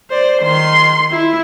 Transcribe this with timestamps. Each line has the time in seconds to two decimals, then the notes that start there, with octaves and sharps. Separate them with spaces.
0.10 C5 D5
0.42 D#3 C6
1.11 E4